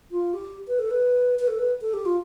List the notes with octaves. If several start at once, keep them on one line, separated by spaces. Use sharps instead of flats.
F4
G4
B4
A4
B4
B4
A4
B4
A4
G4
F4